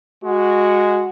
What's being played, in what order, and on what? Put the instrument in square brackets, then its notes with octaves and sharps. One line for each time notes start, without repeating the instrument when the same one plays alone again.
[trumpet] G#3 [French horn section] F#4